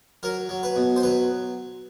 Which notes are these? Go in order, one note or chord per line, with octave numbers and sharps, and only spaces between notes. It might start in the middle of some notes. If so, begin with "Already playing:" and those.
F#3 A#4
F#3
B4
B2
C5
F#3 B4